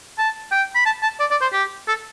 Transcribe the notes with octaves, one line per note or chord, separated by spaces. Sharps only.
A5
G5
B5
A5
A5
D5
D5
C5
G4
A4